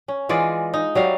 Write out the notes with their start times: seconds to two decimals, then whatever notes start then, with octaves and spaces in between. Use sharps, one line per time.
0.08 C#4
0.29 E3 G#3 F4 D5
0.74 D#4
0.95 F#3 G3 F5